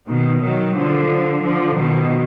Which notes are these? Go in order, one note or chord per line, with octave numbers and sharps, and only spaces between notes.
B2 D#3
D#3 F#3
D3 F3
D3 F3
B2 D#3